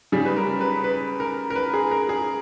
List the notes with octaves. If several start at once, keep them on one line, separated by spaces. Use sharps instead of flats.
C#3 G3 G#4
B4
A#4
B4
B4
A#4
A#4
B4
G#4
A#4
G#4